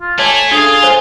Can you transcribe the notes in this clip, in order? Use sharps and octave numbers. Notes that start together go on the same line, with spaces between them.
F4
A3 C#5 G#5 A5 D6
D4 F4 G#4 A4
C5 C#5 G#5